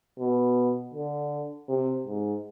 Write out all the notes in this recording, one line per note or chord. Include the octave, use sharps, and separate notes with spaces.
B2
D3
C3
G#2